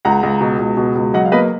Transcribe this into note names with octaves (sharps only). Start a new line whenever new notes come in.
C#2 F#5 A#5
C#2
B2
C#2
B2
C#2
F#3 D#5 F#5
F5
A#3 B4 D#5